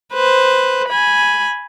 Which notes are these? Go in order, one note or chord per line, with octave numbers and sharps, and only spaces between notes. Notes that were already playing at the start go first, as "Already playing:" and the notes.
B4 C5
G#5 B5